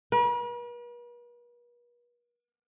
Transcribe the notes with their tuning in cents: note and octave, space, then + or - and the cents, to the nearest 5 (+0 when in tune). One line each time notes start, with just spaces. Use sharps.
B4 -45